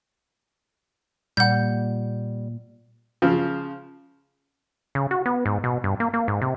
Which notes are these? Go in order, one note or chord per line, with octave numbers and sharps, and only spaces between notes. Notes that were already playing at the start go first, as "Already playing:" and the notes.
A#2 G3 F#5 G6
C#3 F3
C#3
F#4
B3
G#2
B2
G2
A#3
A#3
G#2
C3